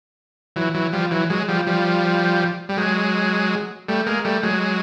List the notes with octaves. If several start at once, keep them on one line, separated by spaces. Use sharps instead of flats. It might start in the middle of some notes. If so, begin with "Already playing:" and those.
E3 F#3
E3 F#3
F3 G3
E3 F#3
F#3 G#3
F3 G3
F3 G3
G3
F#3 G#3
G3 A3
G#3 A#3
G3 A3
F#3 G#3